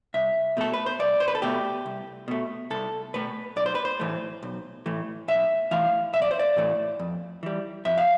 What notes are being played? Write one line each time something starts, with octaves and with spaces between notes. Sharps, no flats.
C2 E5
B2 A3 A4
B4
C5
C2 D5
C5
B4
A4
B2 A3 G4
C2
B2 A3
C2 A4
B2 A3 B4
B1 D5
C5
B4
C5
A2 E3 A3
B1
A2 E3 A3
B1 E5
A2 E3 A3 F5
B1 E5
D5
C5
D5
A2 E3 A3
F2
E3 G3
F2 E5
F5